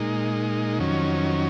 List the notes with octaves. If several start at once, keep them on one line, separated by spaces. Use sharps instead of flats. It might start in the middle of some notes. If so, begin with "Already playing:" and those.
Already playing: A#2 G#3 D#4
F2 D#3 F#3 C#4